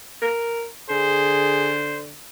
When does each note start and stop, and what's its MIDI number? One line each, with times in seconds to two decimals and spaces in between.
0.22 0.65 70
0.90 2.16 50
0.90 1.74 68
0.90 2.01 72